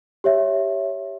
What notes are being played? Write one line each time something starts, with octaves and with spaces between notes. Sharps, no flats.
G4 C#5 E5